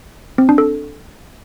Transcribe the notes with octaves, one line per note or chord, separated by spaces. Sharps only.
C4
D4
A4